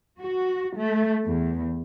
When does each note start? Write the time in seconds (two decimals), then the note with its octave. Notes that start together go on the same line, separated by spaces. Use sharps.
0.20 F#4
0.77 A3
1.24 E2